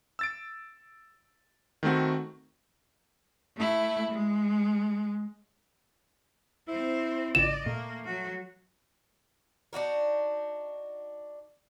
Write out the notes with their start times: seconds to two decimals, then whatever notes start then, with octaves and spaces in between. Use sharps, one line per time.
0.19 E6 A6 D7
1.83 D#3 A3 C4 F#4
3.57 A3 E4
4.11 G#3
6.68 C4 E4 C5
7.35 G#1 C#3 F4 D5 D#5 E7
7.66 A#2 A3 A#3
8.05 F#3 F#4
9.73 D4 D#4 F#4 A#4